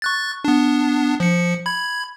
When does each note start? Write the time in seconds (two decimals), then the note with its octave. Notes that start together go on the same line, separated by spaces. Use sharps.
0.02 C#6 F#6 A6
0.45 B3 D4
1.20 F3 C#7
1.66 B5 G#6